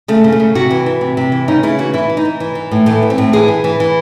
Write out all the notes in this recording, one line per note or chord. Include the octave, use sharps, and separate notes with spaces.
C#3 A3
C#3
A3
C#3
C3 F#4
E3
E3
C3
C3
E3
C#3 D#4
C#3 E4
E3 F#4
E3 E4
E3
D#4
E3
E3
E3
A2
E3 A3
E3
C4
A2
E3 G#4
E3
E3
E3